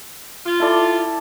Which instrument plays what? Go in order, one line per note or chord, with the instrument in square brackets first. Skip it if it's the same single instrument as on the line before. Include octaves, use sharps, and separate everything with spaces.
[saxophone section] F4
[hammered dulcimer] E4 A4 D5